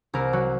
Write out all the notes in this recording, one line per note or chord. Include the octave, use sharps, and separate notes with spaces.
C2 A#4
F#3 F#4